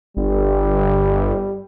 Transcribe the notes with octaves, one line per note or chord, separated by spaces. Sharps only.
G1 G3